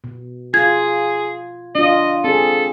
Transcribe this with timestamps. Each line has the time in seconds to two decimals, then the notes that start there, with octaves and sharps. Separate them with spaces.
0.04 B2
0.54 F4 G#4 G#6
1.75 D4 F4 D#5
2.24 C4 G#4 A4